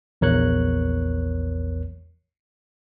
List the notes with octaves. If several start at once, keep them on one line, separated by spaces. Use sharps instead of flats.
A#1 E2 A#4 C#5 C#6 F#6